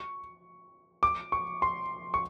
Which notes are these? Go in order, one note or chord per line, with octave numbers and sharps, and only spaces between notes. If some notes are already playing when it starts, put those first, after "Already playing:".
Already playing: C#6
D6
C#6
C6
C#6